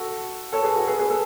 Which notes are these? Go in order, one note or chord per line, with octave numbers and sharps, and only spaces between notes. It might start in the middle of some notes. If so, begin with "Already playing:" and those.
Already playing: F#4 A4
A4 C#5
G#4 B4
F#4 A4
G#4 B4
G#4 B4
A4